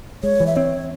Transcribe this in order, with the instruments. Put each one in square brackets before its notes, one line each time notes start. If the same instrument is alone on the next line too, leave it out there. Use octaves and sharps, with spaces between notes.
[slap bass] G#3 [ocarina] C#5
[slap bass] E3
[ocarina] E5
[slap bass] C4 [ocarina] C#5